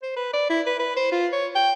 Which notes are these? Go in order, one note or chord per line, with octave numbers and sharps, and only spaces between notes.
C5
B4
D5
E4
B4
B4
C5
F4
C#5
G5